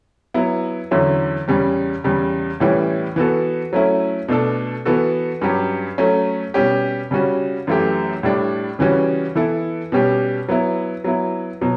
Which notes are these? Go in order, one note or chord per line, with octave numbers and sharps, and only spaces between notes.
F#3 B3 E4
E2 D3 F#3 C#4 E4
E2 C#3 G3 C#4
E2 C#3 G3
A2 E3 G3 C#4 E4
E3 B3 F#4 A4
F#3 A3 C#4 E4
B2 A3 D4 A4
E3 B3 F#4 A4
G2 F#3 C#4 G4
F#3 A3 C#4
B2 G3 C#4 G4
C#3 G3 C#4 F#4
F#2 E3 A3 E4 G4
A2 G3 D4
C#3 E3 G3 C#4 F#4
E3 B3 E4 A4
B2 G3 C#4 G4
F#3 B3 E4
F#3 B3 E4
B2 F#3